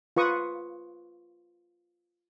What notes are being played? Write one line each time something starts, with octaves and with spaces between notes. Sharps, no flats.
F4 B4 C#6 D#6